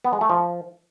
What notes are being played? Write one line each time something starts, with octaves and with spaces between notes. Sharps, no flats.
B3
G#3
A3
F3